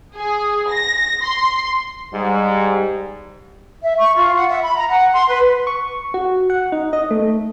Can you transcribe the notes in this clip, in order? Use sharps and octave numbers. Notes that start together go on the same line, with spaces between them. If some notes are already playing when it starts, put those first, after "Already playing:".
G#4
A#6
C6
G#2 G3
E5
C#6
F4
F#5
E5
B5
A#5
F#5
C6
B4
C#6
F#4
F#5
D#4
D#5
A3